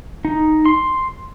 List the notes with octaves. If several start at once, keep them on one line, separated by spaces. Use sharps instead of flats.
D#4
C6